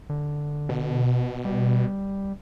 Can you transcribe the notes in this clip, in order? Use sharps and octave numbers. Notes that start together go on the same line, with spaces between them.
D3
B2
G3